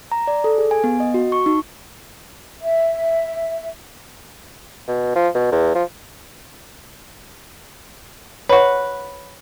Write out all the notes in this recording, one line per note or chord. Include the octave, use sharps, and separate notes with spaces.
A#5
D5
A4
G#4
G#5
B3
D#5
F#4
C#6
D#4
E5
B2
F3
B2
E2
F3
F#4 B4 C#5